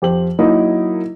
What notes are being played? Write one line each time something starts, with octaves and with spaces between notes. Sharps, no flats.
F2 G4 C5 F#7
F#3 A#3 D#4 E4 A#4